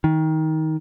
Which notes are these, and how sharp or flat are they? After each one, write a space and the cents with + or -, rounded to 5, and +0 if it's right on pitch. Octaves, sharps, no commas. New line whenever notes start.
D#3 +20